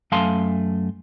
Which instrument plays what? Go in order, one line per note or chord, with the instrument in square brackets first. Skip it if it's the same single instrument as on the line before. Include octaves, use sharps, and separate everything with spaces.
[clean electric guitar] F#2 A3 F5 G#5 A5 C6